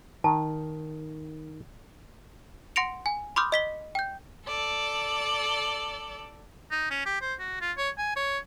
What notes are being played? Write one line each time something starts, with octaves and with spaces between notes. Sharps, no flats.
D#3 A5
F#5 C6 A#6 C#7 D7 F7
G#5
B5 C6 D6 D#6 F6 G6
D#5 B6 G7
G5 G6
A4 D5
D#4
C#4
G4
C5
F#4
F4
C#5
G#5
C#5